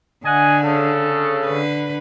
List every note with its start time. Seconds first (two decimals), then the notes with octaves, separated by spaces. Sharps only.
0.25 D3 D#5 F#5 G#5
0.63 C#3 A4
1.45 D3 B4